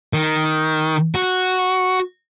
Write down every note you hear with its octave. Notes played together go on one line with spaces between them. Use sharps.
D#3
F#4